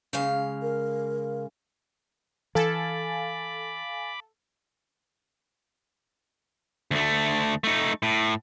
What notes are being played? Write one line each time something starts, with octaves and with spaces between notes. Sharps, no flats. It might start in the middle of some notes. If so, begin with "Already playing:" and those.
C#3 G#3 F5
A#4
E3 A4 F5 G#5 B5 D6 A6
D2 A3
A3 D#4
A2